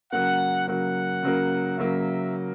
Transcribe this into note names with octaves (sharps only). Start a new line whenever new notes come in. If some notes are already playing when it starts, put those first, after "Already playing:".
C#3 F#3 A#3 F#5
C#3 F#3 A#3 F#5
C#3 F#3 A#3
C#3 F#3 A#3 E5